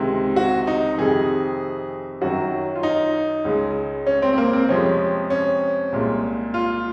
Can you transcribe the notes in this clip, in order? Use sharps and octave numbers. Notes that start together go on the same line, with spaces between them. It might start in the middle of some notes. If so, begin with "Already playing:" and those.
Already playing: C#2 C3 D#3 G#3
F#4
D#4
F2 C3 D#3 G#4
F#2 D#3 F#3 F#4
F4
D#4
C#2 C#3 G#3
C#4
C4
C4
A#3
C4
F2 C3 F3 G#3 C#4
C#4
C2 A#2 G#3
F4